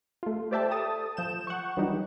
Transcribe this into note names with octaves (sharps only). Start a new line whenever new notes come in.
A3 F4
G4 C5 D5 E5 G5 A5
A4 A5 D#6
F3 G6 E7
F#5 C#6
E3 F#3 G3 D4 D#4 G4